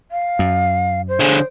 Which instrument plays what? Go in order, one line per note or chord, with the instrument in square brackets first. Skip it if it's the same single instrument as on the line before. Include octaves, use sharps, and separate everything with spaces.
[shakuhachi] F5
[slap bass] F#2
[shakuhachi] C5
[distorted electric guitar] D3 G#4